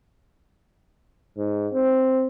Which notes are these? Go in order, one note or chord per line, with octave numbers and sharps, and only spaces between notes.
G#2
C4